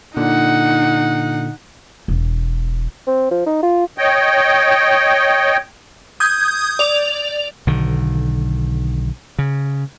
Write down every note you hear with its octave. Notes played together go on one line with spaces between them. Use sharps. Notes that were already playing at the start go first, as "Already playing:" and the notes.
A#2 D3 D#4 F#5
E1
C4
F3
D#4
F4
C#5 D#5 G5
D#6 G6 G#6
D5 F7
B1 D3 D#3
C#3